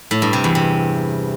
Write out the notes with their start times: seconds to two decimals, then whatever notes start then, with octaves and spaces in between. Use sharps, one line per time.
0.11 A2
0.22 G2
0.33 C3
0.44 E2
0.55 C3